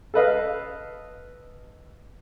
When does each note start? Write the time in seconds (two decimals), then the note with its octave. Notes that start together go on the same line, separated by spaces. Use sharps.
0.14 A4 B4 D#5 F5